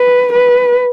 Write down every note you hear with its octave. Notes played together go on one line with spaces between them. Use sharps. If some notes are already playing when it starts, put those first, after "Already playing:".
Already playing: B4
B4